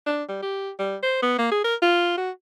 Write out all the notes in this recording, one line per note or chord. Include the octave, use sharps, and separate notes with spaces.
D4
G3
G4
G3
C5
B3
A#3
G#4
A#4
F4
F#4